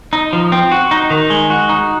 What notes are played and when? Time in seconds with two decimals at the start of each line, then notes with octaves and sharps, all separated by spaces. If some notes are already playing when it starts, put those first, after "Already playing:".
0.13 D#4
0.33 F3
0.52 C4
0.72 F#4
0.91 D#4
1.10 D#3
1.30 G#3
1.50 F#4
1.69 D#4